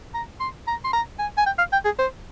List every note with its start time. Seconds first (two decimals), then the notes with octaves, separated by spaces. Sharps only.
0.14 A#5
0.40 C6
0.67 A#5
0.84 C6
0.93 A#5
1.19 G#5
1.37 G#5
1.46 G5
1.58 F5
1.72 G5
1.85 G#4
1.99 C5